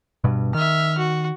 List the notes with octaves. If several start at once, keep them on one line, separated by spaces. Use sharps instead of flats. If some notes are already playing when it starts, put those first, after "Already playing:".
G2 B2
D#3 E5 F6
F#4